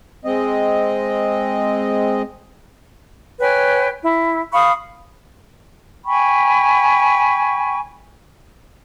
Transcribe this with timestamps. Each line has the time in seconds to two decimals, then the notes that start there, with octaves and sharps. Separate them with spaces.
0.25 G#3 C4 D#5
3.40 B4 C#5 G5 G#5
4.02 E4
4.53 F5 B5 C#6 D#6
6.05 G5 G#5 B5 C#6